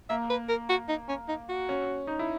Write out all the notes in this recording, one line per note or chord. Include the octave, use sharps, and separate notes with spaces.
A#3 E5
B4
A#4
F#4
D#4
C#4
D#4
F#4
C#4
D#4
E4